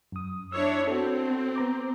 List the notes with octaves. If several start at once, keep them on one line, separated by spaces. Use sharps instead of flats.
F#2 D#6
D4 E4 C#5 C#6 E6
C4 F#4 A4
B3 A#5 D6